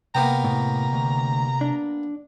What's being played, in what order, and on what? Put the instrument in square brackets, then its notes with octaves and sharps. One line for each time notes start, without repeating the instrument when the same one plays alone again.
[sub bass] C3 [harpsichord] A#3 B3 G5 [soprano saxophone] A#5
[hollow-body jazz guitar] A2
D2
D4